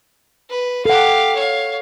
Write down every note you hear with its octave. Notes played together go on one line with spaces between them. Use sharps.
B4
G4 A4 F5 F#5
C#5 F5